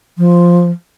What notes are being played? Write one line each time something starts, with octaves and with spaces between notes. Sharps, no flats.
F3